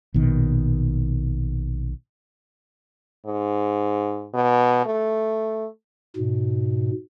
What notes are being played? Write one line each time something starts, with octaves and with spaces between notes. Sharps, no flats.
A#1 B2 D#3
G#2
B2
A3
G#2 B2